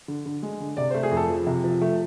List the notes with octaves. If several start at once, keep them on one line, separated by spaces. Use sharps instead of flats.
D3
D3
G#3
D3
C3 D5
A3 C5
G#4
F2
A4
F3
C3
F3
A3